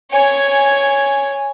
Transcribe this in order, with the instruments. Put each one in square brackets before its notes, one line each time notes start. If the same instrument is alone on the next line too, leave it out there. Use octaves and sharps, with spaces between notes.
[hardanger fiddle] C#5 G#5